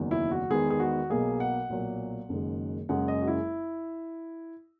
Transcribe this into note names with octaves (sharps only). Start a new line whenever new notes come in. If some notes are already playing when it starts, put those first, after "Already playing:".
Already playing: F#1 E2 D#3 F#3
E4
F#4
E2 D#3 G#3 B3 G#4
G#4
F#4
B1 B2 F#3 A#3 G#4
F#5
B1 A#2 F#3 A#3
F#1 F#2 D#3 G#3
F#1 F#2 C#3 G#3 F#5
D#5
F#4
E4